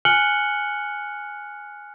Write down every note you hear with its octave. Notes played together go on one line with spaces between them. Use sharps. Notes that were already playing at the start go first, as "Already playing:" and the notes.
G#5 F6 F#6 C#7 F#7 G7